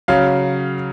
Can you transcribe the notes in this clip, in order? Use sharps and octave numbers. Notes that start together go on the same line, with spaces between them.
C#3 F#3 F5